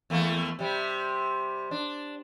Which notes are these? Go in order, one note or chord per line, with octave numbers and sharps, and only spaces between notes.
E2 A3 A#3
C3 G3
D4